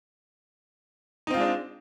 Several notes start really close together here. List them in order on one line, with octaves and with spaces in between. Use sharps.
D#4 C4 F4 G#3 D4